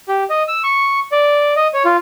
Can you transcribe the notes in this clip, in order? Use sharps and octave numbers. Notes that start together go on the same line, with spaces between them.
G4
D#5
E6
C#6
D5
D#5
C#5
F4